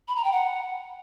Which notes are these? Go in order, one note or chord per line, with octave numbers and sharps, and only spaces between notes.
B5
A#5
G5
F#5